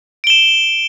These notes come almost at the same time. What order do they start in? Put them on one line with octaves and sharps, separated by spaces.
D7 G7 E7